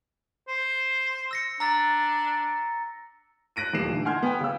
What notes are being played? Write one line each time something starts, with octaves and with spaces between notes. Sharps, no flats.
C5
E6 A#6 C#7
D4 A#5 E6 A6
F#6 A#6 D7 D#7
D#1 A#2 A3 C7 E7
D3 E3
F#5 G#5 C6 F6 G6 G#6
B3 G5
C#3 E6